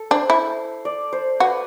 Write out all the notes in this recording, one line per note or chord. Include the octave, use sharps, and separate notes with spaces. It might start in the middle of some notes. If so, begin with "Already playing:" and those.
Already playing: A4
D4 C5
E4
D5
C5
F#4 B4